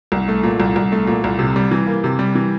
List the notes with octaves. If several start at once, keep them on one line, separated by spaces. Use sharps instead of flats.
C2
A3
A#2
C2
C2
A3
A#2
C2
C3
G3
E3
A#3
C3
G3
E3